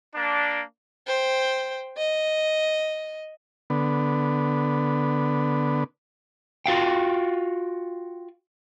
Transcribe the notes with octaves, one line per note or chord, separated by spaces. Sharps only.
A#3 D4
C5 G5
D#5
D3 B3
F4 F#4 F5 G5